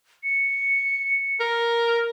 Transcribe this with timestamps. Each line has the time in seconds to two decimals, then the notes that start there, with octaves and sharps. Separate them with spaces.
0.23 C#7
1.40 A#4